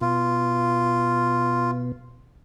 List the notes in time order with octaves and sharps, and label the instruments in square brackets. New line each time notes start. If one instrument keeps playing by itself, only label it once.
[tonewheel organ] B2 [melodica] F4